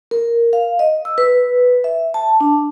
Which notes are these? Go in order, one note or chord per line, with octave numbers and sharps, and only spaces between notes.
A#4
F5
D#5
E6
B4
E5
A5
D4